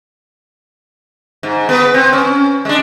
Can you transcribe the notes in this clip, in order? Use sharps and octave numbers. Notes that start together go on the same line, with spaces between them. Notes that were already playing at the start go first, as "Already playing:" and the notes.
G#2
B3 B4
C4
C#4
G#3 D4